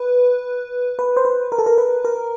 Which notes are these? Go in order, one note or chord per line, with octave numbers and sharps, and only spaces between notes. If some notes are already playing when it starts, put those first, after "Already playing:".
Already playing: B4
B4
C5
B4
A#4
A4
A#4
B4
A#4